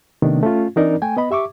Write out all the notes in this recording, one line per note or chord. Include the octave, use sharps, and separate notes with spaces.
C3 D#3 A3 B3 D4
A3 C#4 F4
E3 C4 D4 D#4 A#4 D5
A3 G5 G#5
B3 D#5 B5
G4 E5 C#6 D6